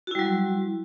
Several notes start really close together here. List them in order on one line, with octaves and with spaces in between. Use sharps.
F#4 E4 G3 F#3